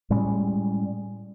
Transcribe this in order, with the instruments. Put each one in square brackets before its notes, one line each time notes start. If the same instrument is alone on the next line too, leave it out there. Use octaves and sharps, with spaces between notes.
[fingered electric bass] A2 G3 G#3 C#4